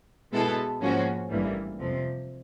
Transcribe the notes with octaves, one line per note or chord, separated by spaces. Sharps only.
B2 G#3 B3 E4 A4
G#2 F3 A#3 C#4 F#4
A1 G2 E3 G3 A#3
F2 C3 F3